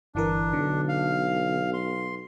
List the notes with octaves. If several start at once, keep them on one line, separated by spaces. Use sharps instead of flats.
G1 E3 D4 A#4
B1 D3
F5
C6